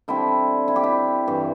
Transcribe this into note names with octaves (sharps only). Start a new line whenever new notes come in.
D3 G3 C4 E4
E4
G4
E4
G2 E3 G3